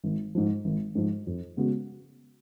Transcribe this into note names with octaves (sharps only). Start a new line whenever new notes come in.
G#1
G#2 F3
G#1
G#2 F3
F2
C#3 G#3 B3 F#4